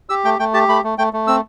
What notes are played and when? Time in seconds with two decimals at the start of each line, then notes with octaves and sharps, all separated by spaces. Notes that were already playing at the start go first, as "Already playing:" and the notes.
0.09 G4 E6
0.24 A3 G5
0.39 A3 G5
0.54 G4 A5
0.68 A3 B5
0.84 A3
0.98 A3 G5
1.13 A3
1.27 C4 E6